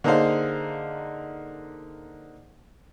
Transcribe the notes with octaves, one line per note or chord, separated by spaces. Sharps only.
D3 A#3 D#4 G#4 C5 F5